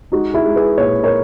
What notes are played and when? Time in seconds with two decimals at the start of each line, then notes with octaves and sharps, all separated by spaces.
0.12 G#3 D#4 F#4
0.34 E4 G#4
0.45 G#3
0.56 G#4 B4
0.78 A#2 C#5
1.03 A#4 C#5